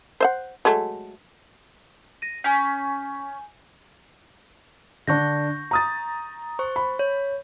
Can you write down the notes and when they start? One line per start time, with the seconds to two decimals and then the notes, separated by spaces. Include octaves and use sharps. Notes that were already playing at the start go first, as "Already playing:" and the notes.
0.20 C5 E5 F#5
0.65 F#3 G#3 A3
2.22 A#6 D#7
2.44 C#4 G#5 G6
5.07 D3 D4 C#6 G6 A#6
5.71 A#5 D#6 A6
6.59 C5 C#6
6.76 B5
6.99 C#5